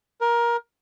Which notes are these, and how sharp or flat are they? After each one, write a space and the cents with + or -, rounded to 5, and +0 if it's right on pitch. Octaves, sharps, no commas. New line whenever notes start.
A#4 +20